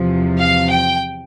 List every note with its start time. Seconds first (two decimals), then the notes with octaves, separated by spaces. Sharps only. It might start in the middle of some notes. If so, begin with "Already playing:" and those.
Already playing: E2 C3 F3
0.38 F5
0.69 G5